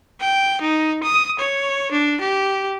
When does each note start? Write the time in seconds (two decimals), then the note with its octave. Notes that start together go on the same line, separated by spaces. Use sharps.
0.21 G5
0.62 D#4
1.04 D#6
1.39 C#5
1.92 D4
2.21 G4